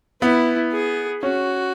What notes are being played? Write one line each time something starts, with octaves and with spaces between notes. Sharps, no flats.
B3 E4
G#4
C#4 F#4